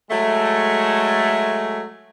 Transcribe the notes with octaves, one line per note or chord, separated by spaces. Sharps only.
F#3 G#3 A3